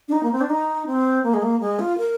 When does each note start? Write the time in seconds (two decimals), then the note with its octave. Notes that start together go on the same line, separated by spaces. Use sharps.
0.08 D4
0.12 D#4
0.23 A#3
0.32 C4
0.41 D4
0.50 D#4
0.87 C4
1.24 A#3
1.34 G#3
1.42 A#3
1.60 G#3
1.79 F4
1.98 A#4